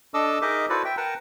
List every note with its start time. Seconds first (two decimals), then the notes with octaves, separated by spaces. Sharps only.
0.14 D4 A4 D#5 D6 E6
0.42 D#4 G#4 A#4 D#5 E5 D6
0.69 E4 F#4 A4 B4 C5 D5
0.85 E5 G5
0.97 A#4 B4 F#5 G5 A5 A#5